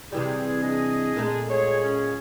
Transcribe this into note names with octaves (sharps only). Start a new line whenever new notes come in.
C3 E3 G3 G4 G#4
D4 E4 G#4 D#5
A#2 G#3 A3
G#4 C#5
C#4